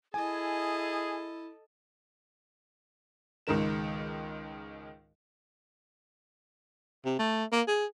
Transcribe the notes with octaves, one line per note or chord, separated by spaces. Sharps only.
E4 G#4 A4 D#5 G#5
C#2 G#2 D#3 A#4 E7
C3
A3
A#3
G#4